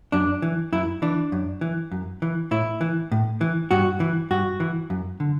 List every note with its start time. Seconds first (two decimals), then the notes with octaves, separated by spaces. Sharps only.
0.12 F#2 D4
0.42 E3
0.72 F#2 E4
1.02 E3 D4
1.32 F#2
1.61 E3
1.92 F#2
2.22 E3
2.51 A2 E4
2.81 E3
3.12 A2
3.41 E3
3.71 G2 F#4
4.00 E3
4.31 G2 F#4
4.60 E3
4.90 F#2
5.20 D3